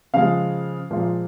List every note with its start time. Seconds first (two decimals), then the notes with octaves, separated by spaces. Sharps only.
0.14 C#3 F3 G#3 F5
0.91 A#2 F3 G#3 F4